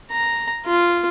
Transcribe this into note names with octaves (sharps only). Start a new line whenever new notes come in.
A#5
F4